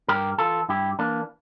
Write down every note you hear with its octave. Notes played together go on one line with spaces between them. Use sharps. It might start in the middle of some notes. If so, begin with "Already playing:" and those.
G2 G4 A#4
E3 F4 A4
G2 E4 G4
E3 A#3 D4